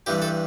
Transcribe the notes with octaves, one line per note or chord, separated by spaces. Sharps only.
G2 E3 G3 G4
A4